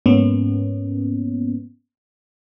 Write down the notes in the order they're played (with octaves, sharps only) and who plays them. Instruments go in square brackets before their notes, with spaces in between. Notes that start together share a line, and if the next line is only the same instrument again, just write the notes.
[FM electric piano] G#2 A#3 B3 C#4